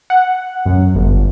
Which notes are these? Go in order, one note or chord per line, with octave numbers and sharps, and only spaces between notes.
F#5
F#2
G1